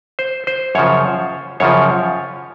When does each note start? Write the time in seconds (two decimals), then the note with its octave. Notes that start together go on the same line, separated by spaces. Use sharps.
0.19 C5
0.47 C5
0.75 F#2 C#3 F3 C#5
1.60 F#2 C#3 F3 C#5